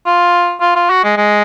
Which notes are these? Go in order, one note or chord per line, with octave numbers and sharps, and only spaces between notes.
F4
F4
F4
F#4
G#3
G#3